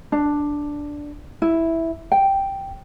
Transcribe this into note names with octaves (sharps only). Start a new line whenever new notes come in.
D4
E4
G5